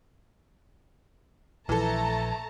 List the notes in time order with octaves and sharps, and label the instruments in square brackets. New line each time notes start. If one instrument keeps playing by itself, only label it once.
[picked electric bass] A#1 [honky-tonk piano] E3 A4 [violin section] A3 A5 A#5